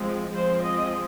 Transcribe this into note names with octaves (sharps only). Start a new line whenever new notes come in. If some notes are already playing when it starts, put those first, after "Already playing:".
Already playing: F3 G#3 C4
F3 G#3 C4 C5
D#5